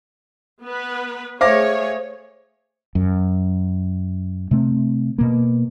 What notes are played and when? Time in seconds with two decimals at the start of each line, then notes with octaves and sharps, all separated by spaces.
0.62 B3 B4
1.41 A3 G#4 C5 C#5 E5 F5 D6 A#6
2.95 F#2
4.51 C3 A3 C4
5.18 B2 A#3